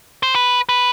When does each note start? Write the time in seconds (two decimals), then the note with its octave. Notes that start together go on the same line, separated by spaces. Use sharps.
0.23 C5
0.35 B4
0.69 B4